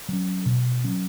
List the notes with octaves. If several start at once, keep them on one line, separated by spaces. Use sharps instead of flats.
F#3 C#4
B2
F#3 C#4